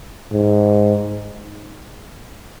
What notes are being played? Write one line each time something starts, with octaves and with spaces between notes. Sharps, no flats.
G#2